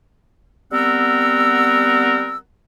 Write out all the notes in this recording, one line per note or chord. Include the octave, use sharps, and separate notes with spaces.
G3 B3 C4 A#4 F#5 E6